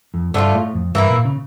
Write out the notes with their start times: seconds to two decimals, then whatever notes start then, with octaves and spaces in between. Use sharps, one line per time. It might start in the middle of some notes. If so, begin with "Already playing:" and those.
0.14 F2
0.34 G2 D3 A3 D4 F4
0.54 A2
0.74 F2
0.95 G2 E3 A#3 E4
1.10 A#2
1.25 C#3